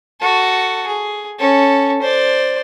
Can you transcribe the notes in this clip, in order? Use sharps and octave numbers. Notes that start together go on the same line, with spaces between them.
F#4 A4
G#4
C#4 A4
C5 D5